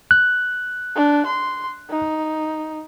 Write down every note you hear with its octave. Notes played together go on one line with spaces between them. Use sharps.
F#6
D4
C6
D#4